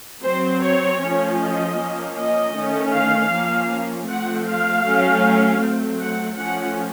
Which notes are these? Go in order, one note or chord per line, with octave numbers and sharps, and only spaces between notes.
F#3 C4 C5
C#5
F3 A3 C#4
D#5
F3 A#3 C#4
D#5
D#3 A3 C#4
F5
F3 A#3 C#4
F3 A3 C4 F#5
F5
F#3 A3 C#4
F#3 A3 C4
F#5
F3 A3 C#4 F#5